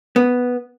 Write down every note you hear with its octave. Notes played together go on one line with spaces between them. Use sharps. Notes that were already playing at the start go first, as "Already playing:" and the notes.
B3